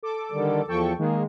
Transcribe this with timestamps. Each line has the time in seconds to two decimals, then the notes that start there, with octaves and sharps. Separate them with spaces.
0.03 A4 D6
0.32 D3 D#3 G3
0.68 E2 F3 A4 G5 C#6
0.98 D#3 G#3 A#3